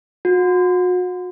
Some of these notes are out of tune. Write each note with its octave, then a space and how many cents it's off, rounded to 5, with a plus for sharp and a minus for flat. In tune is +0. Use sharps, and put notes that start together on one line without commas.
F#4 -35